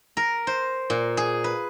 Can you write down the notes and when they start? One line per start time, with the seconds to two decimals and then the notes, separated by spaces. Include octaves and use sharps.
0.17 A#4
0.47 C5
0.90 A#2
1.17 G#4
1.44 B4